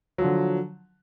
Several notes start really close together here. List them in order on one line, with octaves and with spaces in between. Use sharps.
F#3 F3 D3